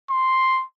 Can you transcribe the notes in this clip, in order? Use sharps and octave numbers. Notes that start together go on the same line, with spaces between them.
C6